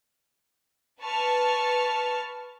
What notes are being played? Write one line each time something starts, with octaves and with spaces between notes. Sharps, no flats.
B4 A5 C#6 F6